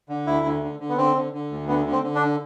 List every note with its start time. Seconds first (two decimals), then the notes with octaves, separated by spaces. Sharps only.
0.09 D3
0.27 D2 E4
0.45 D3
0.63 D3
0.80 D3
0.89 B3
0.97 D3 C4
1.15 D3
1.33 D3
1.51 D2
1.68 D3 B3
1.86 D3
1.92 C4
2.03 D3
2.15 D4